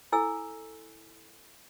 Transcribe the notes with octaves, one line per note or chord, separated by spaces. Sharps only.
E4 A4 G#5 E6